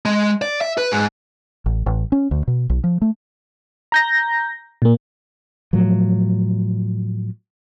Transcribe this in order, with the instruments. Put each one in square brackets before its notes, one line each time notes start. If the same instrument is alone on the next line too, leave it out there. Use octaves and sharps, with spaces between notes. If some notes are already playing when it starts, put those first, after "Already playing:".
[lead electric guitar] G#3
D5
E5
B4
G#2
[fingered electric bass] A1
A1
C#4
D2
B2
B1
F3
A3
[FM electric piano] A#5 G6 A#6
A#2 A#3
[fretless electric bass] A2 F3 F#3